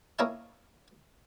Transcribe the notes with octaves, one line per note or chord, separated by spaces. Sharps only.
A#3 C#4 E4 D#5 F5 A5